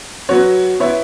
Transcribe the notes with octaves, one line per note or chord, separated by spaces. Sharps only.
F#3 B3 F#4 C#5
B3 E4 C#5 E5